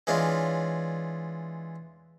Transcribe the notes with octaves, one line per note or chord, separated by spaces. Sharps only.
E3 G#3 D4 F4 C#5